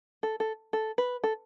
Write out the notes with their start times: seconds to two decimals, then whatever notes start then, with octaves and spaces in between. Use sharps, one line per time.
0.23 A4
0.40 A4
0.73 A4
0.98 B4
1.24 A4